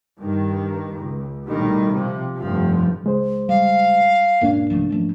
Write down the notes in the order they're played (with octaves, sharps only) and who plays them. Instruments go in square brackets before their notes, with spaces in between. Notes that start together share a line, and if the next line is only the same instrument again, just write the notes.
[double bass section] G2 D#3
C#2
B1 A2 D#3 G3
C3 F3
F1 G2 F3
[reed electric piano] C#2 G#3 C5
[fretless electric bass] G3 [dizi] F5
[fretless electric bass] E1 C#4 [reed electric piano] G#2 A#3 D4
[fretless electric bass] C2 F3 A3
F3 A3 C#4